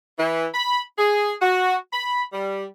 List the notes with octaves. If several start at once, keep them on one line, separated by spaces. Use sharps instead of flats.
E3
B5
G#4
F#4
B5
G3